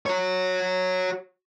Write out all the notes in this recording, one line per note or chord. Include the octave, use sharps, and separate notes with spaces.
F#4 C#5